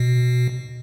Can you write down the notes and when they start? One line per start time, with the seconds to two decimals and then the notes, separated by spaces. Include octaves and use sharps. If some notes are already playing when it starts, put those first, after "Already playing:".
Already playing: B2